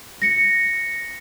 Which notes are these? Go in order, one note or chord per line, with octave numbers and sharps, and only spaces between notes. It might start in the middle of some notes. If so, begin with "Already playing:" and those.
A#6 C#7